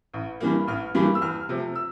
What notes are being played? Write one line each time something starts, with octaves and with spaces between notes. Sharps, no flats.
A1
G2 E3 G3 A#3
A1 F6
G2 E3 G3 A#3
E6
E2 F6
C3 F3 A3
E6